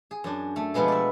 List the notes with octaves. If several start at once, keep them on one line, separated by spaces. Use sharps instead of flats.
G#4
F#2 D4
A3
B2 F3 G#3 B3 G#4
D5 E5